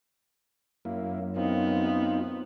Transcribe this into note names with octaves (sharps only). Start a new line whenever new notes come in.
F#2 A#3 E4
B3 C4 D#4 F4